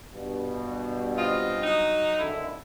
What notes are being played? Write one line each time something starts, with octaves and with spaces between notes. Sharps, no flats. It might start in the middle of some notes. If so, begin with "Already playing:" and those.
G2 B2
C4 F4 D#5
F#3 D#4
G#1 D3 E4